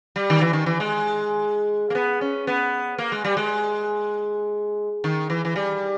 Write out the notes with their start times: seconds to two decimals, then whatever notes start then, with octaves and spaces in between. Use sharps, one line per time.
0.16 G3
0.30 D#3
0.41 E3
0.53 D#3
0.66 E3
0.80 G#3
1.90 A#3
1.95 B3
2.21 C#4
2.47 B3
2.98 A#3
3.12 G#3
3.25 G3
3.37 G#3
5.04 D#3
5.30 E3
5.45 E3
5.56 G3